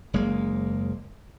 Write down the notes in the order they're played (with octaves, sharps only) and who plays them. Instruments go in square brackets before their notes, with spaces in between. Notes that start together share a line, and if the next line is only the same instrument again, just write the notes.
[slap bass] F#1 G#3 A#3